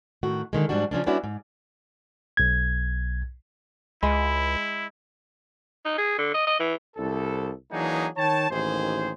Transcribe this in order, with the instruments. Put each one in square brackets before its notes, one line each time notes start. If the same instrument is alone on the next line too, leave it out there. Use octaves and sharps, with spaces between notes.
[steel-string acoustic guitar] A2 D#3 F#4
D3 D#3 G#3
G#2 F3 G3 G#3 D4 F#4
C#3 F3 C#4 D4
G3 B3 C#4 D4 E4 F#4
G#2
[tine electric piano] B1 G#6
[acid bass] C#2 [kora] G#3 [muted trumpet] E4 [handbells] B5
[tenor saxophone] D#4
G#4
D3
D#5
D#5
E3
[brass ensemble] C2 A4
E3 F#3 A#3 D4 D#4 G#4
D#3 C#5 G5 A5
A1 D#2 D#3 G#4 C5